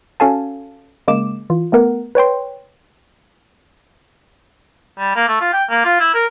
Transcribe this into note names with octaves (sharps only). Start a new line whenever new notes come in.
C#4 F#4 A4 F5 G#5 A5
C#3 G#3 A#3 D6 E7
E3 F4
A3 B3 A#4 F#5
B4 C#5 G5 C6
G3
A#3
A3
F4
G5
A#3
F4
E4
A#4